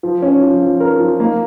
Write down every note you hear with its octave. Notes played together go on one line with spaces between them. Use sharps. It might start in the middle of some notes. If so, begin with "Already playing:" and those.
F3
C#4
F3
F3
A#4
F3
A#3